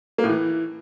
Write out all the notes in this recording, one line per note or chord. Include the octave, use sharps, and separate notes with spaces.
A#3
A2
E3